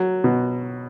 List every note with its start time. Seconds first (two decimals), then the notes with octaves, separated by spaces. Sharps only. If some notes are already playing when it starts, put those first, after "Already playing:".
Already playing: F#3
0.24 B2